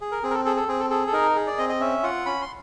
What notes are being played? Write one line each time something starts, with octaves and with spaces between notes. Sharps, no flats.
G#4
A#4
C4 G#4
A#4
A4
G#4 A4
A4
C4 G#4
A4
G#4 A4
A4
D#4 A#4
G#4
D5
C4 D#5
D#5
C#4 E5
F4 F#5
C#4 B5
C6